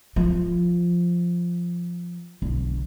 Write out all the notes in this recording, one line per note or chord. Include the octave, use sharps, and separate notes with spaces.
F3
B1 D3